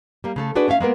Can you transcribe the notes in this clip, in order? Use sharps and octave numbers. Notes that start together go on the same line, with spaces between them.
G3 A#3
C#3 A3 A4
D4 F#4 G#4 B4 D5
A3 C#4 E5 F5
G#3 A#3 B3 A#4